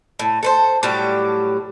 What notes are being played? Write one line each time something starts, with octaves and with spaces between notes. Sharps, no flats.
A2
A4 B4 C5
A2 F#3 G3 G4